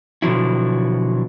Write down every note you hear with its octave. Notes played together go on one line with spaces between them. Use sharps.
B2 D3 F3 F#3 E4